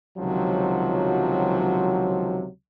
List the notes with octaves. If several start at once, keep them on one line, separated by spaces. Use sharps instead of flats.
C#2 C3 D#3 F3 F#3